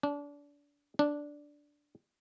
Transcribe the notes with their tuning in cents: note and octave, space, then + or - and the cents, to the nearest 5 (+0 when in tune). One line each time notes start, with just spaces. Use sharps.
D4 -30
D4 -5